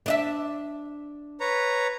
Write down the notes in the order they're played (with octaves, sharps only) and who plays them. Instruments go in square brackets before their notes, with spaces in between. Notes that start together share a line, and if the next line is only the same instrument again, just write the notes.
[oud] D4 D#5 E5
[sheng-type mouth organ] B4 C#5 A#5